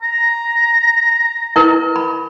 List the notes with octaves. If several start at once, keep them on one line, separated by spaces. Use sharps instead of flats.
A#5
E4 A#4 B4
B5